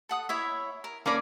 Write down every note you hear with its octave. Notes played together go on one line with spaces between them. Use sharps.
A4 F#5 D#6
E4 C#5 E5
A#4
A#3 C#4 A4 D5 A#5 B5